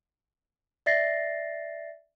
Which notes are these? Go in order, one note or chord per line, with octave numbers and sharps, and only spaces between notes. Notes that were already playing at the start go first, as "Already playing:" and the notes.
D5 E5 A6 A#6 C7